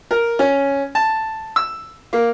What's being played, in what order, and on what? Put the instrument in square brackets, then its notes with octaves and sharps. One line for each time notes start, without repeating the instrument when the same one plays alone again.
[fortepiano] A#4
C#4
A5
E6
A#3